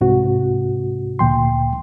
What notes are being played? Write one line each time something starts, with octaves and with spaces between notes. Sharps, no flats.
C2 G#2 C3 F#4
D2 A#2 G5 C6